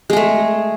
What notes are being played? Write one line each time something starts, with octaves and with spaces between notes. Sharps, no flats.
G#3 A3 G#4